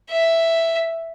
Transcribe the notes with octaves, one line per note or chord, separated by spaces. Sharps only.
E5